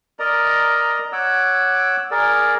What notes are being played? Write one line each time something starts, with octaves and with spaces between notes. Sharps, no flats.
A#4 D5 D#5 A#5
C#5 F#5 D6 E6
G#4 A#4 D5